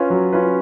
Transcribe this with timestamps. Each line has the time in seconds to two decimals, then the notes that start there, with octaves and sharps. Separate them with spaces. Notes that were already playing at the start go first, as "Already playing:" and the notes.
Already playing: C#4 F4 B4
0.10 F#3
0.33 C#4 F4 B4